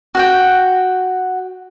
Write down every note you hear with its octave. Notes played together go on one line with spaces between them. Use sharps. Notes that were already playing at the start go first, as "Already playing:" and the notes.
F#4 F#5 G5